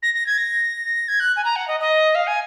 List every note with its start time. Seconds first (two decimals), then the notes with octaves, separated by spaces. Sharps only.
0.02 A#6
0.14 A#6
0.26 G#6
0.37 A#6
1.08 G#6
1.20 F#6
1.36 G#5
1.44 A#5
1.55 F#5
1.67 D#5
1.80 D#5
2.15 F5
2.27 G#5